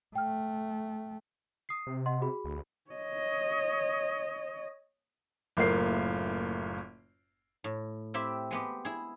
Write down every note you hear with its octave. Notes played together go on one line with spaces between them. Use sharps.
A3 G5 F6
D#6 C7
C3
D#5 F#5 C6
F#4 G#4 B5
D2
C#5 D#5
F#1 A2 A#3 F4 C7
A2
C4 E4 G4 E5
G#3 B3 G4
E4 G#4